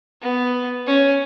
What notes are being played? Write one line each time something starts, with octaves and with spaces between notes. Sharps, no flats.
B3
C#4